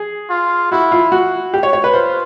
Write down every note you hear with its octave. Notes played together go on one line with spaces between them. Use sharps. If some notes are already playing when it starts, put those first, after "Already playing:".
Already playing: G#4
F4
E4 F#4
F4
F#4
G4
C#5
C#5
B4
F4 C5